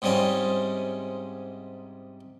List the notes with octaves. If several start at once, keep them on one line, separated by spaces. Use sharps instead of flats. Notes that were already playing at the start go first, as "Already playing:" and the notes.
G#2 C3 G3 C#4 D#4 F4